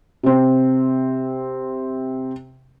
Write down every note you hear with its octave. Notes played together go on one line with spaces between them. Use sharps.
C3 C4